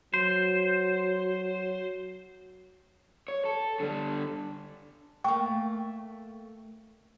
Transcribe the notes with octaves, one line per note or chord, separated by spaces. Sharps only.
F#3 C5
C#5
A4
D3 G3
A3 A#3 G5 C#6